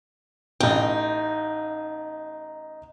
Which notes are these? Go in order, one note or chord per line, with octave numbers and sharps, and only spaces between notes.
A1 D#4 G5